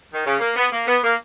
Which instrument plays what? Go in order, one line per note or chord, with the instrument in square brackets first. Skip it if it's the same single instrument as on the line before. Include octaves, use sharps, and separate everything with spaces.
[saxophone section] D#3
C#3
A#3
B3
A#3
B3
A#3